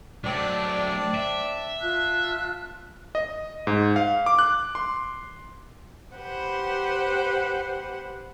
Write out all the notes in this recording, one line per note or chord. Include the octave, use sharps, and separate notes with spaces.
F#3 A3 C4 D4
E5
F4 A5 F#6
D#5
G#2
F5
D6
F#6
C6
G4 B4 C5 F#5